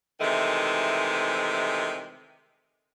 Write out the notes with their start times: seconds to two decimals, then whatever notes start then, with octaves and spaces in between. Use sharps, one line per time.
0.21 C3 D#3 E3 G#3 A3